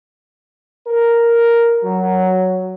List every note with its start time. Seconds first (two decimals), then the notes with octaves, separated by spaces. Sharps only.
0.87 A#4
1.83 F#3